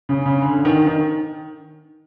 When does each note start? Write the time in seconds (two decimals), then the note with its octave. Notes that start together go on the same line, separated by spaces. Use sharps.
0.09 C#3
0.26 C#3
0.42 D3
0.56 D3
0.65 D#3
0.87 D#3